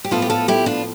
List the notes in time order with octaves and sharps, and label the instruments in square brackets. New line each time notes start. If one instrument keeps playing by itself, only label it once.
[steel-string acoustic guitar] G4
A2 F3 B3 F4 A4
G4
F4 A4
E4 G4
D4 F4